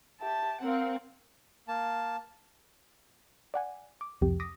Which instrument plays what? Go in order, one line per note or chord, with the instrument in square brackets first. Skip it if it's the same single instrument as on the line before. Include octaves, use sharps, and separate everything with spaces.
[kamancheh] G4 E5 [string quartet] A5
[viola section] C4 [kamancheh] A#4 F5 [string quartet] F#5
[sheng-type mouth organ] A#3 A5
[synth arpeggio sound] D5 F#5 G#5
D6
C2 F2 G4
D6 D#6 A#6 B6